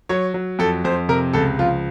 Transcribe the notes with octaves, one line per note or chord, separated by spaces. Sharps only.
F#3 C#5
F#3
F2 A4
F2 C5
C3 A#4
C#2 A4
F3 F4